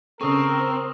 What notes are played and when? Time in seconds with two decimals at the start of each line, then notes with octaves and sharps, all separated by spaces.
0.21 C#3 C4 A4 A#4 C#6 D#6 E6